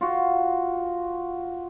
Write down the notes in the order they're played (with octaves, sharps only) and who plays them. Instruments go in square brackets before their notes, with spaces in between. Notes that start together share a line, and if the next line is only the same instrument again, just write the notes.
[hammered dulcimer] F4 F#4